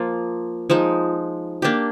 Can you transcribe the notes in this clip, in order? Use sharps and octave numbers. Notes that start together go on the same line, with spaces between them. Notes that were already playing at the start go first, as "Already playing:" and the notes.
Already playing: F3 A#3 F4
F3 G#3 D#4
A#3 D4 G4